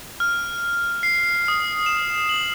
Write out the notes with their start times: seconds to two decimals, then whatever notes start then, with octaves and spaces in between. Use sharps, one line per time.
0.20 F6
1.03 C7
1.48 D#6
1.86 E7
2.29 F#7